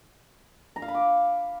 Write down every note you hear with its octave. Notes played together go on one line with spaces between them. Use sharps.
A#5
F5
B5
D6